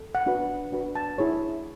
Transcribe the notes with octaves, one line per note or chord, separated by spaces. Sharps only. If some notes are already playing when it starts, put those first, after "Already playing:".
Already playing: A4
F#5
D4 F#4 B4
D4 F#4 B4
A5
E4 G#4 C#5